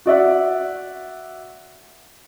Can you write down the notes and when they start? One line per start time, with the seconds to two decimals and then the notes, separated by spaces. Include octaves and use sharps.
0.06 F#4 D5 E5 F#5